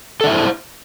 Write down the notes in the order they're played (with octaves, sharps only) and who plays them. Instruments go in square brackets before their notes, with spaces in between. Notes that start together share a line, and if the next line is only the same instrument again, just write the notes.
[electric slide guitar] A4
D4
E5
E4
C5